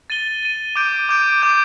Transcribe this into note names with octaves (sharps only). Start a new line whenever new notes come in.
A6 D#7 G7
A6 D#7 G7
D6 G6 D7
D6 G6 D7
D6 G6 D7